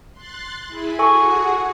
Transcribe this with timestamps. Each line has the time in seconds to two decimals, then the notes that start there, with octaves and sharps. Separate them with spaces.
0.13 C6 F#6 A6
0.67 E4 G#4 B5
0.99 F#4 G#4 A4 F#5 G#5 C#6